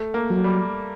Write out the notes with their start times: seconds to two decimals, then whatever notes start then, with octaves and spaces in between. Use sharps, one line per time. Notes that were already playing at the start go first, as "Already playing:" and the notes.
Already playing: A3
0.14 A#3
0.30 F#3
0.44 G3